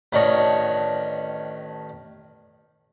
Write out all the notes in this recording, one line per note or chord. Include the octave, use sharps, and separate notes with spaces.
A1 D#3 D4 C#5 D#5